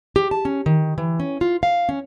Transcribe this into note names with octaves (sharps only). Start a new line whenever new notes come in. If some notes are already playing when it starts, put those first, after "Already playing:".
G4
A5
C#4
D#3
E3
C#4
F4
F5
C#4